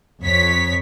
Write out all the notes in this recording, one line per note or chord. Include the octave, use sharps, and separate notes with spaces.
F2 C#5 B6